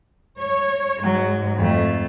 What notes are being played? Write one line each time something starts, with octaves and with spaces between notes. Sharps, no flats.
C#5
G#2 F#3
F2 A3